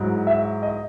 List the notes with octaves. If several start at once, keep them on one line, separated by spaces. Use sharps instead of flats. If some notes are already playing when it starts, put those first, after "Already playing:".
Already playing: G#2 F#3 E4
E5
D#5